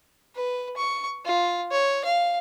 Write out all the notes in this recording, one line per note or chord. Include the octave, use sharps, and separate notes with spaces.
B4
C#6
F4
C#5
F5